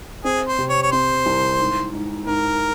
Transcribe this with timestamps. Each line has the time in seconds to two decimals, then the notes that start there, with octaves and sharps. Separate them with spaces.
0.24 C4 G#4
0.48 C5
0.58 C3
0.69 C#5
0.83 C#5
0.92 C4 C5
1.26 C2
1.59 G#2
1.94 G#2
2.27 G#2 A#4